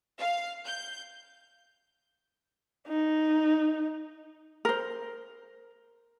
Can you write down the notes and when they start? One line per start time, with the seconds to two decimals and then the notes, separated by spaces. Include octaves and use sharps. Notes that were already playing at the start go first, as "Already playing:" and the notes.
0.18 F5
0.64 G6
2.88 D#4
4.65 A#4 C5